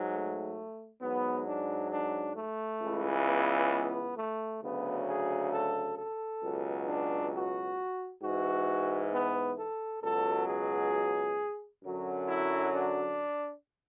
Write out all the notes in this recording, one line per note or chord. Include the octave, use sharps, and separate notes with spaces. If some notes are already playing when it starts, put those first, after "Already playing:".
Already playing: G#2 F#3
A3
G#2 F#3 B3
D4
D4
A3
C#2 C#3 E3
B3
B3
A3
D2 C#3 F#3 B3
G#4
A4
A4
C#2 B2 F#3
D4
F#4
G#2 E3 F#4
B3
A4
C#2 B2 F#3 A4
G#4
F#2 D3 F#3
E4
D4